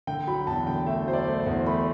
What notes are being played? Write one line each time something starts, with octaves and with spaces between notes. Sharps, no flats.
D3 G5
F#3 B5
E2 A5
D3 G5
A3 E5
F#3 C5
D5
A3
C5
E2
A3 B5